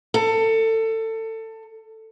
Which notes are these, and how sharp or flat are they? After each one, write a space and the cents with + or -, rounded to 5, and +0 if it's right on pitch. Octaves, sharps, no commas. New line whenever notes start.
A4 +25